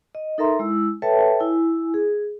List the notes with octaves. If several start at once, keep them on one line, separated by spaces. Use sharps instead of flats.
D#5
D#4 A4 A#4 E5 A#5 C6
G#3 E4 E6
A4 B4 C#5 E5 G5 A5
E4 G#5
G#4